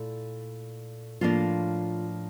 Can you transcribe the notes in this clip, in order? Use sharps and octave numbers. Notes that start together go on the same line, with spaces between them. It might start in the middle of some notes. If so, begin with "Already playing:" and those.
Already playing: A#2 A3 E4
A2 F3 A#3 D4 F4